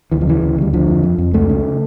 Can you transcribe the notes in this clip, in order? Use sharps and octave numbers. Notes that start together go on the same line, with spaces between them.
D2 E3
F3
C#3 E3
D2
D2 G3
D3 F3
F2
F2
F2
C#2 A3
C#3